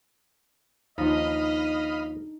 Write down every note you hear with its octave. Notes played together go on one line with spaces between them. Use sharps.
D#2 F3 D4 D#4 D#5 F5 B5 D#6